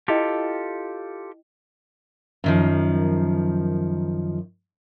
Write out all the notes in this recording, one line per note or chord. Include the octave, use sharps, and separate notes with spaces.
E4 F4 G4 A4 D#5 G5
F#2 D#3 F3